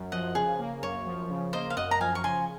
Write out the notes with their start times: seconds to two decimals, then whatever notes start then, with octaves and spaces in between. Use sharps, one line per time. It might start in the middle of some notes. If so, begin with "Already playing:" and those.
Already playing: F#2
0.12 F3 D#5 F#5
0.35 C#3 G#4
0.59 A#3
0.83 F#2 C#5
1.06 F3
1.30 C#3
1.53 A#3 C5 D#5
1.70 F5
1.77 F#2 D#5 F#5
1.91 A#5
2.00 F3 F5 G#5
2.15 C#6
2.24 C#3 G#5 C6